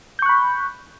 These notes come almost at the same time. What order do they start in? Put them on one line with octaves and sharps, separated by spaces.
G6 C#6 F#6 B5